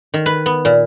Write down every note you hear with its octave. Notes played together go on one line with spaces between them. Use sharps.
D#3
B4
B3
A#2